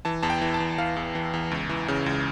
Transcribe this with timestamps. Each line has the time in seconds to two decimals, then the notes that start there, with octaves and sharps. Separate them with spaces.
0.05 E3 A5
0.23 E2 A5
0.30 G5
0.41 E3
0.54 A5
0.60 E2
0.78 E3 F5
0.96 E2
1.15 E3
1.34 E2
1.51 C#2
1.69 E3
1.88 C#3
2.06 C#2